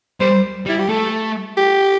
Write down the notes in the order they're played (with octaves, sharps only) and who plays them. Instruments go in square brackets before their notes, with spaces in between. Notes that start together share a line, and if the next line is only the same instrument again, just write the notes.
[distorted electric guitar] G3 [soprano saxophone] C5
[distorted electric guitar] G3
[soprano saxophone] E4
G4
[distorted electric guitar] A3 [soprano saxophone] A4
[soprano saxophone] G4